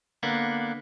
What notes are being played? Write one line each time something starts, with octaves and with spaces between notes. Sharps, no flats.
D3 A#3 B3